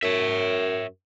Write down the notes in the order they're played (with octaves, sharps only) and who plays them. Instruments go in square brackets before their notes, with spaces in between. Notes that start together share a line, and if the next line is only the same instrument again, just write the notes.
[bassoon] F#2 [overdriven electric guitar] C#5 E5